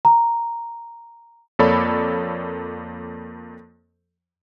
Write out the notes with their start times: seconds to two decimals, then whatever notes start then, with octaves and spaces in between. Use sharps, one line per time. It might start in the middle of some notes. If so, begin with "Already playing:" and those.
0.05 A#5
1.59 F2 A#3 A4 C#5 D5 B5